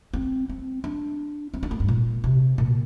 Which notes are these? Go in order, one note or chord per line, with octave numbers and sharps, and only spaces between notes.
C4
C4
D4
C4
D4
A#3
G2
A#2
C3
A#2